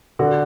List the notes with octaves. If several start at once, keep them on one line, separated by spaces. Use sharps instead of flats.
D3 F#4